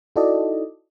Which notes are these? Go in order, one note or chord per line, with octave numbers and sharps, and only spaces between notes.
D#4 E4 F#4 A4 D5 D#5